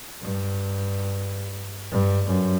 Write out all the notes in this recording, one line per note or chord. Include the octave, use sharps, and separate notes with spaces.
G2
G2
F#2